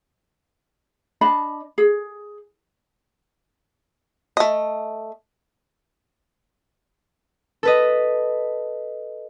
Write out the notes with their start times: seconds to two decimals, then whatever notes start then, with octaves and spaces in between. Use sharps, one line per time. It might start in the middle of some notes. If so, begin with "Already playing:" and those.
1.21 D4 D#5 A5 B5
1.78 G#4
4.37 A3 D#5
7.63 A4 B4 D#5